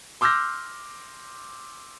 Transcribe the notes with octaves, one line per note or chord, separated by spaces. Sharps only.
C6 D6 E6 F6 G6 A#6